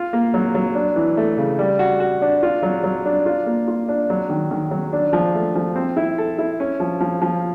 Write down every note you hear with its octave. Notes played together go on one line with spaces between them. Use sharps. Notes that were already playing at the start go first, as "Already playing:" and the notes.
Already playing: F4
A#3
F#3
F#3
D4
E3
A3
C#3
G3
F#4
F#4
D4
F4
F#3
F#3
D4
F4
A#3
F4
D4
F#3
D#3
D#3
F#3
D4
F3
A3
F3
C4
E4
A4
E4
C#4
F3
F3
F3